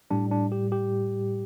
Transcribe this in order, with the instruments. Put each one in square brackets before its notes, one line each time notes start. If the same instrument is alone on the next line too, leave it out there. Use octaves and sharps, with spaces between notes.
[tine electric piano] A2 G3 D4
D4
G4
G4